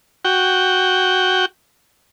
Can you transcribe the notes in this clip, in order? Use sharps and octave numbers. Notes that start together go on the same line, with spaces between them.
F#4 G5